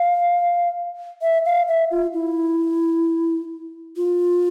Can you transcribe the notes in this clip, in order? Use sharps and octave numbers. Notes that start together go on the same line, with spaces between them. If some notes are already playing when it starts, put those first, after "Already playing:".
Already playing: F5
E5
F5
E5
F4
E4
F4